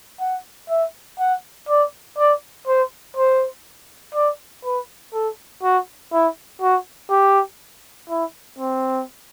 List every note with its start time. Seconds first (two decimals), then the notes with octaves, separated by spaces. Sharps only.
0.20 F#5
0.70 E5
1.19 F#5
1.69 D5
2.18 D5
2.67 C5
3.17 C5
4.15 D5
4.64 B4
5.14 A4
5.63 F#4
6.13 E4
6.62 F#4
7.11 G4
8.10 E4
8.58 C4